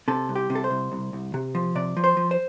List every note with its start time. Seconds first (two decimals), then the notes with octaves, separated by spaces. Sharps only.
0.08 C3 A4
0.29 C2
0.36 G4
0.50 C3
0.55 A4
0.64 C5
0.71 C2
0.92 C2
1.13 C2
1.34 C3
1.55 F3
1.75 C3 D5
1.97 F3
2.04 C5
2.17 F3
2.31 C5